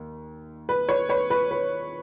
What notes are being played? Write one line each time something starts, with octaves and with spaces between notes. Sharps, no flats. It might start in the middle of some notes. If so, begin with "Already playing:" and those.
Already playing: D#2
B4
B4 C#5
B4 C#5
B4
B4